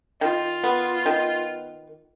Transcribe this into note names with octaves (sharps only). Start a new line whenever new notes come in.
D#3 F4
B3
D#3